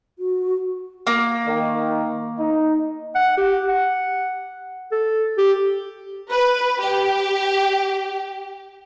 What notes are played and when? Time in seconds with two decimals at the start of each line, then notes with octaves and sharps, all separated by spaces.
0.19 F#4
1.07 A#3
1.46 D#3
2.39 D#4
3.15 F#5
3.38 G4
3.69 F#5
4.92 A4
5.38 G4
6.32 B4
6.81 G4